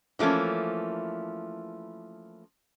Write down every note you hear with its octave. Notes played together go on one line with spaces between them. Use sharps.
E3 F3 A3 A#3 C#4